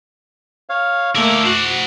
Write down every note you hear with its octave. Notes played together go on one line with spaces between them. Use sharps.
C#5 F5
D3 A3 A#3 E4 D6
F#4 C5 F#5